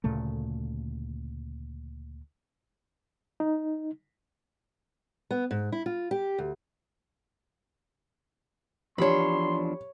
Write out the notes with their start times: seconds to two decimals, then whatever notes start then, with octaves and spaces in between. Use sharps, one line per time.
0.04 D2 A#2 C#3 A3
3.40 D#4
5.31 B3
5.51 G#2
5.72 E4
5.86 F4
6.11 G4
6.38 D2
8.98 E2 F3 D4 G4 C#5 B5 C6